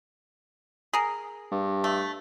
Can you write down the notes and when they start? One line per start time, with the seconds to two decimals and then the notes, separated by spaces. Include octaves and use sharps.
0.93 G#4 A#4
1.51 G2
1.84 A3